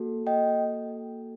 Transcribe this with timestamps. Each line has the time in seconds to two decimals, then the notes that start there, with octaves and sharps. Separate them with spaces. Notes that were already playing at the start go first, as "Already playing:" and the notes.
Already playing: A#3 F#4 A4
0.27 D#5 G5